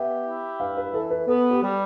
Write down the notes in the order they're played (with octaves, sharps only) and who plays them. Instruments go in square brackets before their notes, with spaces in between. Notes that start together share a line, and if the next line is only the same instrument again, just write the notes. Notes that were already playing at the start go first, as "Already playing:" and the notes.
Already playing: [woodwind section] B3 G4 [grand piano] E5
[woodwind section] E4
[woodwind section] G2 [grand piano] F5
[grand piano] B4
[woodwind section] E3 [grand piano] A4
[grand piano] B4
[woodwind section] B3 [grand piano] A4
[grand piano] G4
[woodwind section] G3